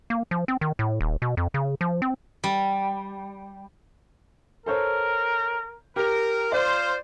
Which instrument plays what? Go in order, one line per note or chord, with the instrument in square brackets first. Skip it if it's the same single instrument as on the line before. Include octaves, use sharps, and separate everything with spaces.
[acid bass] A#3
F3
C4
D#3
A2
D#1
B2
F2
C#3
F3
C4
[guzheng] G3
[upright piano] A4 C5 C#5 [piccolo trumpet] A#4
[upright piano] G4 [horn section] A#4
[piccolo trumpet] F4 [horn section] C5 [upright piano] D5